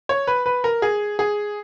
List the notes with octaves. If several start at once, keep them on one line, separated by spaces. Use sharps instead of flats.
C#5
B4
B4
A#4
G#4
G#4